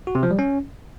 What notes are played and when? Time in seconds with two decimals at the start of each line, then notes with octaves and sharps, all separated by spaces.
0.07 F#4
0.15 C3
0.23 F3
0.31 G3
0.39 C#4